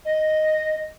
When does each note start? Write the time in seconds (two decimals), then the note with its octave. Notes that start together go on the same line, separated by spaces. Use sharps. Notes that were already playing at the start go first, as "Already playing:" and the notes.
0.05 D#5